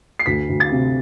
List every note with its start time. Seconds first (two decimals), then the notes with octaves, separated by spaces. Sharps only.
0.19 C7
0.26 D2 B6
0.49 D2
0.60 A6
0.71 C3